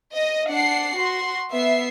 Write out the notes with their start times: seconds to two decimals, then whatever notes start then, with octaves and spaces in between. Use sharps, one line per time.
0.14 D#5
0.48 D4 F#5 C7
0.97 F#4 C6
1.52 B3 E5 C7